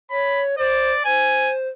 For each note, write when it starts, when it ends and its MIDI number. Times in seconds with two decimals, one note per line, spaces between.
0.11 0.56 73
0.11 0.42 83
0.58 0.92 72
0.58 1.03 74
1.05 1.69 72
1.05 1.54 80